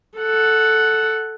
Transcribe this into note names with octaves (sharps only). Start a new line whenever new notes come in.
A4 F#5